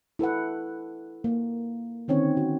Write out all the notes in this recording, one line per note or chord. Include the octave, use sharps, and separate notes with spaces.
E4 A4 B4 F#5
A#3
D3 D#3 C4 C#4 C#5
F#4